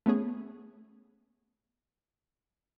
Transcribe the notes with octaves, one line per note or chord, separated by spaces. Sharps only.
A3 B3 C#4 G#4